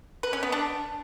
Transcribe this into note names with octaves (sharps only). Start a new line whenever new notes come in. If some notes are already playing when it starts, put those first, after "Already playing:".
B4
C#4
B3
D4